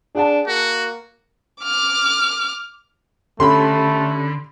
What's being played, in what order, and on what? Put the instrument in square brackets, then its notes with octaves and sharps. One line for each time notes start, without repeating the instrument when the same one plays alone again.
[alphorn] D4 [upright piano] G#4 F#5 A5
[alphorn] A#3 [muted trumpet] F#4
[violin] D6 F6
[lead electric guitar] D3 [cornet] A3 [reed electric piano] C#4 G4 A4 [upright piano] B5 C6